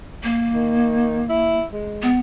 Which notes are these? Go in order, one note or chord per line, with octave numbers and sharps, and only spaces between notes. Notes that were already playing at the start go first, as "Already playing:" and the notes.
A#3
D#3
E4
G#3
B3